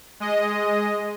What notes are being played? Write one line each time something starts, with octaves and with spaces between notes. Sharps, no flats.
G#3 D#5